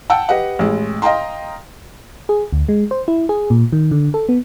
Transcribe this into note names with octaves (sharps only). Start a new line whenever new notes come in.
F#5 G5 A5 E6
G4 B4 D#5 F#5
A1 G#3
D#5 F5 G5 A#5 C6
G#4
D2
G#3
C5
E4
G#4
A#2
D#3
D3
A4
B3